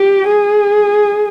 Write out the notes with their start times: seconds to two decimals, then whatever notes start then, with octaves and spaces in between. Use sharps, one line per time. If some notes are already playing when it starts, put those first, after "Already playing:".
Already playing: G4
0.27 G#4